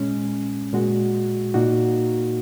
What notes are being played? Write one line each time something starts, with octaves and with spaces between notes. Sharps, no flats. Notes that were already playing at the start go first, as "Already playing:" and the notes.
Already playing: A#2 G#3 C#4
A#2 G#3 F#4
A#2 A#3 D#4 F#4